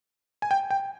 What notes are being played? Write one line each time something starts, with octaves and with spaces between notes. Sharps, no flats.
G#5
G5
G5